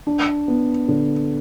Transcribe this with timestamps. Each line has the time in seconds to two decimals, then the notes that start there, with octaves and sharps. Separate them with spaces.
0.07 D4
0.48 B3
0.88 D3